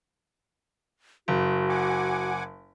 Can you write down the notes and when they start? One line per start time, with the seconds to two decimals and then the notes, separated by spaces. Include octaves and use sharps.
1.28 F#1 F#4
1.69 F#5 G#5 D6